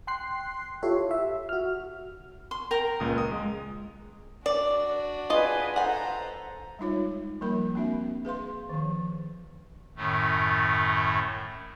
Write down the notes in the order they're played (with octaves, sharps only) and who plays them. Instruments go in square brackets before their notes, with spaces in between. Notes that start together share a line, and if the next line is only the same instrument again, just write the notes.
[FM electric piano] G5 C6 F#6 C7
E4 F4 G4 A4 C#5 E5
E5
F#4 F6
[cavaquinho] C6
A#4 G5 A#5
[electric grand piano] C#2 A#2 D#6
D#6
G#3
[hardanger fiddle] D4 F#4 [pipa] D5
[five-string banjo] F4 D#5 [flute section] G#4 B4 G#5
[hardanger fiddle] A4 A#5 [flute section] C5 [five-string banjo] F#5 G#5
[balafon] G3 G#3 D#4 F4 C#5
F3 G3 A#3 A#4 B5
A#3 C4 D4 F#4 E5
G#4 B4 F5 C6
D#3 F3
[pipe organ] F#2 A2 D#3 A3